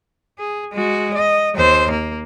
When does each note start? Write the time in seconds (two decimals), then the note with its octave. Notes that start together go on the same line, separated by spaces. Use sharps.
0.39 G#4
0.72 G#3 F#4
1.15 D#5
1.55 D#2 C5
1.91 A#3